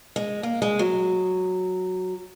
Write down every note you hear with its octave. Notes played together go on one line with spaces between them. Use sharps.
G#3
A#3
G#3
F#3